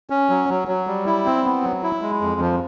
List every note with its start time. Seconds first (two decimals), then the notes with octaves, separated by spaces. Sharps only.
0.10 C#4
0.29 F#3
0.49 F#3
0.68 F#3
0.87 G3
1.06 E4
1.25 C4
1.44 B3
1.63 F#3
1.83 E4
2.02 G#3
2.21 F2
2.41 F3